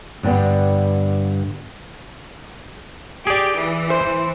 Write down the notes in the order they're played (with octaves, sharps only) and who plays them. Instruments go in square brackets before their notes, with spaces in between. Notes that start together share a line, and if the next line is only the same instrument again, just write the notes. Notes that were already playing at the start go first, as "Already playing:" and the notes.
[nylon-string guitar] G2 D3 G3 B3
[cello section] G4 [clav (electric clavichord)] G#4 D5
[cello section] E3
[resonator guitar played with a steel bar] C5